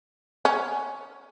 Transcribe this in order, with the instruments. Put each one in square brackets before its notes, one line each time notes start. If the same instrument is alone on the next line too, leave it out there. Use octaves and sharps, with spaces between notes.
[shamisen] C#4